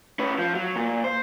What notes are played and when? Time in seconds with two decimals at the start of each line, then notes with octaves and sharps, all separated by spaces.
0.19 C#4 B4
0.39 F3
0.55 F#3
0.76 A#2
1.04 C5